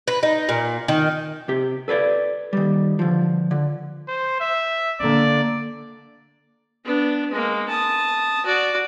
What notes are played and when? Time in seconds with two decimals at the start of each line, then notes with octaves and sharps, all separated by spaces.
0.08 B4
0.23 D#4
0.49 A#2
0.88 D#3
1.48 C3 G4
1.88 A4 B4 C#5 D5
2.53 D#3 G3
2.99 D3 F3
3.51 D3
4.08 C5
4.40 E5
5.00 D3 A#3 D5
6.85 B3 D4
7.30 G#3 A#3
7.68 A5 D#6
8.46 F#4 D5